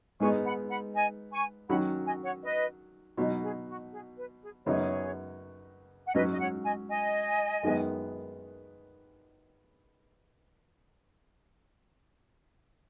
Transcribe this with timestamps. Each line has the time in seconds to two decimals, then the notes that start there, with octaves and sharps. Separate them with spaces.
0.20 G#2 G#3 B3 D#4 G#5 C#6
0.45 F#5 B5
0.69 F#5 B5
0.94 D#5 G#5
1.32 G#5 C#6
1.69 D#3 F#3 C#4 F#5 B5
2.06 D#5 G#5
2.24 C#5 F#5
2.43 B4 D#5
3.17 B2 F#3 D#4
3.42 G#4
3.67 F#4
3.91 G#4
4.17 B4
4.41 G#4
4.66 F#2 C#3 B3 D#4 G#4 C#5
6.07 F#5
6.15 G#2 F#3 C#4 B4 D#5
6.32 D#5
6.39 C#5 F#5
6.64 D#5 G#5
6.89 D#5 G#5
7.63 F#2 D#3 G#3 B3